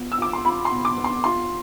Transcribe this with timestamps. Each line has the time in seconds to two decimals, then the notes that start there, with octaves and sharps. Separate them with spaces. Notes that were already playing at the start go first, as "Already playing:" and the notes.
Already playing: B3 F4
0.12 E6
0.18 F4 D6
0.33 C6
0.45 F4 B5
0.65 C6
0.72 B2
0.85 D6
0.97 B3
1.04 C6
1.24 F4 C6